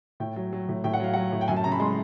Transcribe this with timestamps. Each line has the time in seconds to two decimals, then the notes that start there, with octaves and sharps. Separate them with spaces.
0.20 A2 G5
0.36 F#3
0.53 F#3
0.69 A2
0.84 A2 G5
0.93 F#5
1.00 F#3 F5
1.13 F#3 F#5
1.32 A2
1.41 G5
1.48 F#2 G#5
1.56 A5
1.64 C#3 A#5
1.72 B5
1.80 G#3 C6